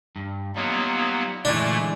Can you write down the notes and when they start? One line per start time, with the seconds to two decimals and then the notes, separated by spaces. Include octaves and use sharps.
0.16 G2
0.56 F#3 G3 A#3 B3 D#4 F4
1.45 A#2 D3 E3 G#3 A3 D4 E4